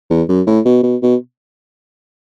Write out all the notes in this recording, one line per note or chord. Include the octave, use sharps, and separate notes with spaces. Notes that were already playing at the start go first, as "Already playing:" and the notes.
E2
F#2
A2
B2
B2
B2